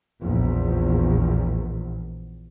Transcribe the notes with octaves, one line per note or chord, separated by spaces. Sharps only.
A#1 E2